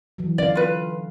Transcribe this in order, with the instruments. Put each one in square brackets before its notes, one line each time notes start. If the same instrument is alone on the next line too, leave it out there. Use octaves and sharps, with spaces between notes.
[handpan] E3 F#3
[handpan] D3 C#4 F5 [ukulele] D5
[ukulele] F4 B4